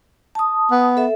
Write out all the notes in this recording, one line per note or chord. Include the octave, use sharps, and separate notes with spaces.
A5 D#6
B3
A4 E5